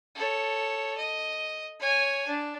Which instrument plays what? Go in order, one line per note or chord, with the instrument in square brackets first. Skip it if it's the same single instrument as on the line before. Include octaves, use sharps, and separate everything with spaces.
[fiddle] A4 C#5
D#5
C#5 G#5
D4